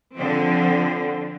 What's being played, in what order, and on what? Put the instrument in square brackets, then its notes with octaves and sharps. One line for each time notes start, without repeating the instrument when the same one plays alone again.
[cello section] D3 F3 C4